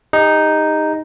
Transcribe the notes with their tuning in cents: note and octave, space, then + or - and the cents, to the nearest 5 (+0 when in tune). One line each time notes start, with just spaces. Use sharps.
D#4 +0 G4 +40